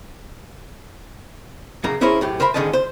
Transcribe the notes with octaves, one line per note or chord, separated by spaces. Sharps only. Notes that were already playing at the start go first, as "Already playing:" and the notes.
F#2 C#3 A#3 A#5
C#4 E4 G#4 A#4 C5 C#5
F#2 A2 G4
A#4 C5 E5 B5 C6
G#2 D3 D#3 C#4 D#5 A5
C5